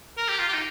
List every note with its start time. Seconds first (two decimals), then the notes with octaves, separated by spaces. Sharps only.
0.17 A#4
0.28 G4
0.39 F4
0.48 G4
0.54 D#4